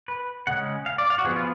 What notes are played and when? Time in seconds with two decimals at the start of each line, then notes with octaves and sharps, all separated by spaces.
0.08 B4
0.47 C#3 G#3 C#4 F#5
0.86 F5
0.98 D5
1.10 F5
1.18 F#4
1.24 F3 B3 G#4
1.36 F4